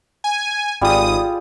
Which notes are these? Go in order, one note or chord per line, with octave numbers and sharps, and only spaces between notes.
G#5
G#1 G3 F4 G#4 D#6